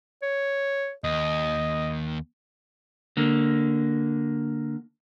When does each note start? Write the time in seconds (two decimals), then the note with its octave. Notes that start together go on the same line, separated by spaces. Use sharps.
0.22 C#5
1.04 D#2 D#5
3.17 D3 A#3